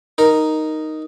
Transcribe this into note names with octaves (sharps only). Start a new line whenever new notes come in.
D#4 A#4